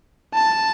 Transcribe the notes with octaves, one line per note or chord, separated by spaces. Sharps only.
A5